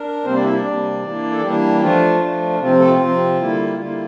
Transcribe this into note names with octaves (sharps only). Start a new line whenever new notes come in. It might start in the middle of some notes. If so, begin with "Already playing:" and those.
Already playing: D4 A#4
C3 G3 A#3 C4 C5
D4 D5
E4 E5
D4 D5
C3 G3 A#3
E3 A#3 D4
A4
E3 G3 A#3 D4 G4
F3 A3 D4 F4
F3 A3 D4
C3 F3 C4 F4
A3 A4
F4
C3 F3 C4
D3 G3 A#3 E4
D3 G3 A#3 E4 F4